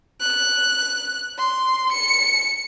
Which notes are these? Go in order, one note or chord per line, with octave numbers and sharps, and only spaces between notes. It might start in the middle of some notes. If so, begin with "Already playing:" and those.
F#6
C6
C#7